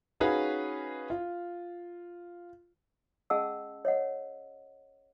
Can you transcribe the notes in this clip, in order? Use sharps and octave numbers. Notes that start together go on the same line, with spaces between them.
C#4 D#4 F#4 G#4 B4 F5
F4
C#4 G#4 D#5 F#5 A5 E6
C#5 D#5 F#5